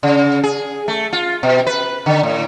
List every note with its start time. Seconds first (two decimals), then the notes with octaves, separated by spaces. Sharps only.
0.03 C#3
0.44 G#4
0.88 A3
1.13 F4
1.43 B2
1.67 B4
2.06 D3
2.23 A2